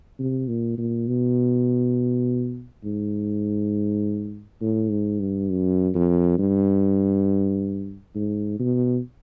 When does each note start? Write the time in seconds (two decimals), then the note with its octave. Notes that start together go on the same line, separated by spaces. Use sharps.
0.19 C3
0.48 A#2
0.78 A#2
1.07 B2
2.84 G#2
4.61 A2
4.91 G#2
5.20 G2
5.50 F#2
5.94 F2
6.39 G2
8.16 G#2
8.59 B2